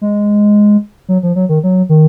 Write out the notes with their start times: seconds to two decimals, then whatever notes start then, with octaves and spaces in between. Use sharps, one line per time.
0.01 G#3
1.08 F#3
1.23 F3
1.36 F#3
1.49 D#3
1.63 F#3
1.89 D#3